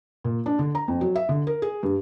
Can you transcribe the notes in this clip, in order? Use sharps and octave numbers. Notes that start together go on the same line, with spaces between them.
A#2
D4
D3
A#5
F2
F#3
E5
D3
A#4
G#4
G2